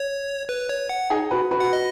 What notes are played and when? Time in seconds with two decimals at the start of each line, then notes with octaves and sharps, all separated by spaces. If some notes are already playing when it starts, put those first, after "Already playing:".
Already playing: C#5
0.49 B4
0.69 C#5
0.89 F#5
1.10 D#4 G#4
1.31 F#4 B4
1.51 F#4 B4
1.60 F#5
1.73 D#5